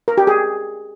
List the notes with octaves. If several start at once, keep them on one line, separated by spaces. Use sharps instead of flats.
A#4
G4
G#4